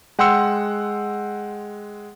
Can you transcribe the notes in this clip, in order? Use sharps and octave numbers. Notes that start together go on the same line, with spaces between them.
G#3 F#5 G5 C6 E6 C#7